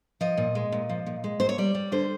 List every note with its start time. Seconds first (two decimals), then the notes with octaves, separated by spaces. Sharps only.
0.21 F3 D#5
0.37 A#2
0.55 G#3
0.72 A#2
0.90 F3
1.06 A#2
1.24 G#3
1.40 A#2 C5
1.49 C#5
1.58 G3 D5
1.75 G3
1.92 D3 C5